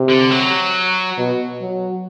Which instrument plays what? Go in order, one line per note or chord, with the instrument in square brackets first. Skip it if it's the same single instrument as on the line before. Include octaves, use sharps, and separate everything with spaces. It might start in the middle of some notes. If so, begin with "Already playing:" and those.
Already playing: [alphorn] C3
[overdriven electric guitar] D3
F#3
[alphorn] B2
F#3